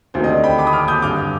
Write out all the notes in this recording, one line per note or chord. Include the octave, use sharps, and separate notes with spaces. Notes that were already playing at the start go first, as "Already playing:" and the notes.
D2 C3 D#3 C5
D#5
D5
G5 B5
B5 D6
D#6
D6 F6
D#6 G6
G2 D3 D6 F6